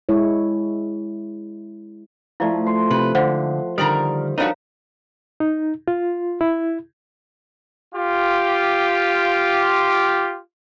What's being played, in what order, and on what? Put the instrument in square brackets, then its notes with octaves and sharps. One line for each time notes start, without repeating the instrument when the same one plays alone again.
[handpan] G#3 E4 C#5
[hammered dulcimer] F3 A3 [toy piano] E4 D5
[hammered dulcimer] C6
[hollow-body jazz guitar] C3 [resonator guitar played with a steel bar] B4
[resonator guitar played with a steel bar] G#2 [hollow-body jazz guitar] D3 [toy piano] C5 F5 F#5
[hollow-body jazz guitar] D3 D#3 G3 [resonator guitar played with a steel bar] A#4 D5 A#5 [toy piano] D#6
[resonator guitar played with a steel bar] G3 A3 F#4 [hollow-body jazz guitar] D4 D#4 [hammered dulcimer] A#4 [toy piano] C#5 F5
[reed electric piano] D#4
F4
E4
[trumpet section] F4 G4